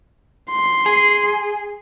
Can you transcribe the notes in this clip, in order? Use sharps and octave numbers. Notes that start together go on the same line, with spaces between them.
C6
G#4